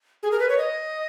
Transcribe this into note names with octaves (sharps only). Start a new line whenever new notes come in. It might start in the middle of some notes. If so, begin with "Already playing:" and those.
G#4
A#4
B4
C#5
D#5